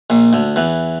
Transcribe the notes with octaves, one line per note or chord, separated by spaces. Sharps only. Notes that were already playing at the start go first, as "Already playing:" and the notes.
A#1 A#2
D2 D3
E2 E3